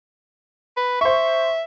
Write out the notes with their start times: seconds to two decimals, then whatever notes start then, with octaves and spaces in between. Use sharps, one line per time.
0.77 B4
1.01 C5 E5 C#6